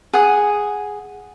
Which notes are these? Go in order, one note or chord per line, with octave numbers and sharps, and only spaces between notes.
G#4 F#5 G#5 D#6